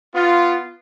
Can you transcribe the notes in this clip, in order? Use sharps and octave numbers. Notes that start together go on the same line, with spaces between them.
B3 F4